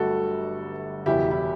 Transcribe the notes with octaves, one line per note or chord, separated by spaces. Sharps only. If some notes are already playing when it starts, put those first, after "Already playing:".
Already playing: G1 G2 F#3 A3 F#4 G4 A4
F#1 E2 B2 E4 G4
E4